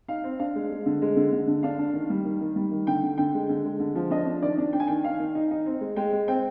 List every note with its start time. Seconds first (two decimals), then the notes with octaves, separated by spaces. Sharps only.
0.08 D#4 F5
0.24 C4
0.39 D4 F5
0.55 G#3
0.71 G#3
0.86 D3
1.02 G#3
1.17 D3
1.32 D3
1.47 D3
1.63 D4 F5
1.79 D4
1.94 D#3
2.10 G3
2.25 D#3
2.41 D#3
2.56 G3
2.72 D#3
2.87 D3 G5
3.03 D3
3.18 D3 G5
3.34 G#3
3.49 D3
3.65 G#3
3.80 D3
3.95 F3
4.11 D4 D#5
4.27 D4
4.42 D#3 D5
4.58 D4
4.73 D4 G5
4.80 G#5
4.88 D#3 G5
5.04 D#3 F5
5.20 D#3
5.35 D#4
5.51 D#4
5.66 C4
5.81 G#3
5.96 G#3 G5
6.13 G#3
6.28 C4 G5